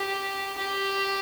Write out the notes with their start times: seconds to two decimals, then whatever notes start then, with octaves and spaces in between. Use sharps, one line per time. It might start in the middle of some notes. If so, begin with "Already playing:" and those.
Already playing: G4
0.58 G4